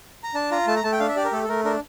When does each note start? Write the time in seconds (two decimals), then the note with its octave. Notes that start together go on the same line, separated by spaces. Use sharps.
0.24 A#5
0.34 D4 A5
0.51 F4 A#5
0.67 A3 A5
0.76 A#5
0.84 A3 A5
0.92 G5
1.00 D4 F5
1.09 E5
1.16 G4 D5
1.25 A#4
1.32 A3 A4
1.43 A4
1.49 A3 A#4
1.65 D4 A#4